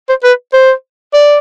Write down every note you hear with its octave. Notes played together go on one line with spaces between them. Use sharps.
C5
B4
C5
D5